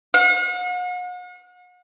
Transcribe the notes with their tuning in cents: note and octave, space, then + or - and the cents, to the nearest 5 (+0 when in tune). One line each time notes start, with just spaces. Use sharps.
F#5 -40